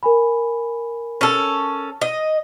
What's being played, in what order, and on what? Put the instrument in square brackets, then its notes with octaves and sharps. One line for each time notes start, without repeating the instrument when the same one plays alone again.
[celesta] A#4 G#5 B5
[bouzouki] C#4 A4
D#5